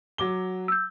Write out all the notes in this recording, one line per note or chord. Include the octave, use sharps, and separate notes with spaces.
F#3 D6 G7
E6 G6